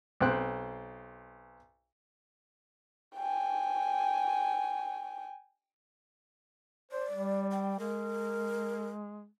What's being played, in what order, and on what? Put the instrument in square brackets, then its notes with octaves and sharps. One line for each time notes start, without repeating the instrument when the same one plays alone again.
[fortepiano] B1 C4 C5 G5 C6 F#6
[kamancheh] G5 G#5
[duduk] C5 [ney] D5
[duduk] G3
[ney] G5
[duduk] G#3 [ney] A#4